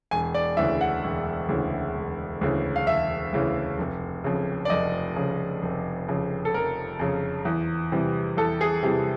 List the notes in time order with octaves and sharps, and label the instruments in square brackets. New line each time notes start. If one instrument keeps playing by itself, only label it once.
[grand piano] E1 G#5
D5
D2 C#3 E3 E5
F#5
E1
D2 C#3 E3
E1
D2 C#3 E3
F5
E1 E5
D2 C#3 E3
F1
F2 C#3
D5
F1 D#5
F2 C#3
F1
F2 C#3
A4
F1 A#4
F2 C#3
E2
C3 E3 G3
E2 A4
G#4
C3 E3 G3 G#4